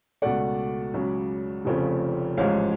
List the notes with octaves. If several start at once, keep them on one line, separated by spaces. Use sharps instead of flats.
C#2 B2 A3 D5 F#5
C#2 C#3 F#3
F1 F2 C#3 F3 A3
A1 G#2 F3 G#3 C#5 F5